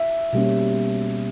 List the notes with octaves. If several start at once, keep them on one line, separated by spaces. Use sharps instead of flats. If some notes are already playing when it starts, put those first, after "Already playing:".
Already playing: E5
B2 G3 A#3 C#4